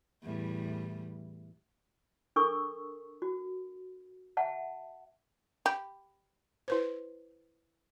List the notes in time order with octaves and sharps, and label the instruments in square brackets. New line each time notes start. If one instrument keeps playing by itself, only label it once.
[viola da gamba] E2 A2 G3
[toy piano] D4 A4 A#4 C#6 D#6 E6
F#4
E5 F#5 A5
[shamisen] G4 [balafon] B5
[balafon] E4 B4 C5